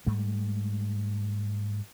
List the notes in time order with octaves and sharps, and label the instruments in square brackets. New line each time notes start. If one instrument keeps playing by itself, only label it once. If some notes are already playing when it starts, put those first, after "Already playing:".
[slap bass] G#2 G3 A3